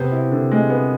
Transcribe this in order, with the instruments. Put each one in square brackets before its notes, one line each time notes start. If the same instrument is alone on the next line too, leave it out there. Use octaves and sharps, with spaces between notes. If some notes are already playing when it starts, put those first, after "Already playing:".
Already playing: [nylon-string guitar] C3 [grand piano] B3
[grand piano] E4
D3
G#3
B3